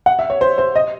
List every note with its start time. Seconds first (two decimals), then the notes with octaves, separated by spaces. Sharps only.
0.06 F#5
0.19 E5
0.30 C#5
0.41 C5
0.58 C5
0.76 D#5